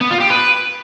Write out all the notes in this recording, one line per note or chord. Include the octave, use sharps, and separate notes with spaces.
B3
F4
G4
B4